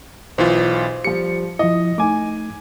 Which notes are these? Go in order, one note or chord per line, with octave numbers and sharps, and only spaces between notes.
B1 E3 F4 C5
F3 G3 C#7
F3 E4 D#5
A3 D#4 G#5 D6